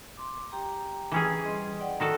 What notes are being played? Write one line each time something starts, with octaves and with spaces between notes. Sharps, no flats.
C6 D6
G4 G5 A#5
E3 C#4 G#4
G3 D#5 C6
D5 F#5 G5
D#3 F#4 A4